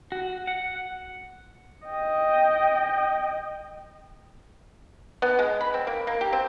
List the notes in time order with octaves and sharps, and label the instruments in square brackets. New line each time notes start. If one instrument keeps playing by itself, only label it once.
[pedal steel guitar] F#4
F#5
[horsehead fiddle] D#5 G5
[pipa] B3
G#3
B5
C4
A#3
A#3
G4
C4